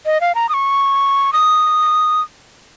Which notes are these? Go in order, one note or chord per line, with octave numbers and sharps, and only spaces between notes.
D#5
F5
A#5
D#6
C#6
D#6